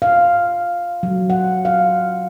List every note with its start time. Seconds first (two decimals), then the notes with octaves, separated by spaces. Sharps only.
0.02 F5
1.03 F#3
1.30 F#5
1.65 F5